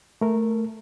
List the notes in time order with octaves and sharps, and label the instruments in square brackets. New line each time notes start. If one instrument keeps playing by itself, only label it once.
[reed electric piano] A3 A#4